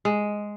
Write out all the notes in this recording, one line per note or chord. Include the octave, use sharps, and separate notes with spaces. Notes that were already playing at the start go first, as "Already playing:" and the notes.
G#3